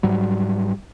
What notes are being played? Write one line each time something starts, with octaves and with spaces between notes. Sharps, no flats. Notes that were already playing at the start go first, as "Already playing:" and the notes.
G#2 F#3 G3